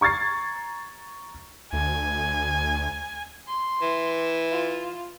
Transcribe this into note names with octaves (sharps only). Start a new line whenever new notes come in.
A#5 C#6 G#6 A6 C7
D2 G#5
C6
E3
F4